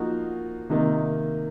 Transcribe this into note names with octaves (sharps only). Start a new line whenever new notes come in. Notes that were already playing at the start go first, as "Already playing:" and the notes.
Already playing: F3 A#3 D#4 F#4
C3 D#3 A#3 D#4